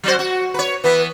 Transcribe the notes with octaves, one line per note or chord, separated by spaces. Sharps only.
F#3 F#4 C5
F#4
B4 C#5
E3 B3 B4